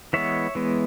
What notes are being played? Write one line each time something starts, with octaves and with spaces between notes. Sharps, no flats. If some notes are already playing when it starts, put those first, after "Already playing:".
E3 G#3 B3 C#5 E5
E3 G#3 B3